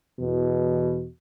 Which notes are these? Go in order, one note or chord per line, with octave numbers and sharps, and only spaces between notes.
E2 B2